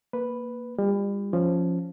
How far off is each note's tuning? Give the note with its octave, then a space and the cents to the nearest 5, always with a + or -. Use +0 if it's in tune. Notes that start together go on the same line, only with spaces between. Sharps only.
A#3 +0 B4 +0
G3 +35 F4 +0
F3 +0 C#4 +0